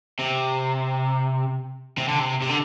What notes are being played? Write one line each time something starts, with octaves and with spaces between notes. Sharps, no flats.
C3
C3
D3
C3
C3
D3